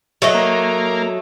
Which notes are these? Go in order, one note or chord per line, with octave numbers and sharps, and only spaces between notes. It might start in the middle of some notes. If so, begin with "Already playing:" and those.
F#3 A3 D#5
A#3